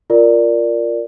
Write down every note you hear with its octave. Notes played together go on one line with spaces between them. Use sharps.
F4 A#4 D5